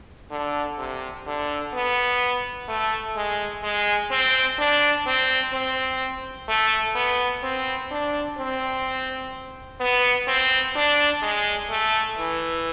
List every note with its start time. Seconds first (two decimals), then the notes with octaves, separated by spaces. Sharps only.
0.31 D3
0.78 C3
1.27 D3
1.74 B3
2.68 A3
3.16 G#3
3.63 G#3
4.11 C4
4.59 D4
5.07 C4
5.53 C4
6.48 A3
6.95 B3
7.43 C4
7.91 D4
8.38 C4
9.80 B3
10.27 C4
10.76 D4
11.22 G#3
11.70 A3
12.18 E3